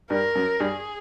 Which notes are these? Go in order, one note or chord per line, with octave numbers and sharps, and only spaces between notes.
G2 A#4
F#2
G2 G#4